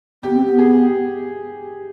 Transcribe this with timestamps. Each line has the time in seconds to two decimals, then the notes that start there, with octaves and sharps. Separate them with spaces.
0.23 B3 G4
0.34 C4
0.45 B3
0.58 G#4